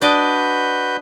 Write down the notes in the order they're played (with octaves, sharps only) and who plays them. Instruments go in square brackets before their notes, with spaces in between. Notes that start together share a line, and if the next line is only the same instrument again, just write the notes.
[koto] D4 D5 D#5 [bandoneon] F#4 B4 G6